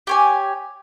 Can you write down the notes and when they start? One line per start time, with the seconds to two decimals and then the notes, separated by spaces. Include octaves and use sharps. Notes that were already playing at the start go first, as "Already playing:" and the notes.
0.07 G4 C#5 G#5